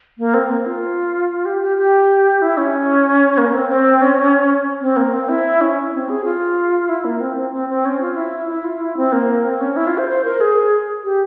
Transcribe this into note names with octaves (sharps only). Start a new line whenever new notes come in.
A#3
C4
A#3
F4
G4
G4
G4
E4
C#4
A#3
C4
C4
C#4
C4
A#3
C4
E4
C#4
C4
G#4
F4
E4
A#3
C4
C4
C4
C4
C#4
F4
E4
E4
F4
E4
C4
A#3
C4
C#4
E4
F4
C5
C5
A#4
G#4
G4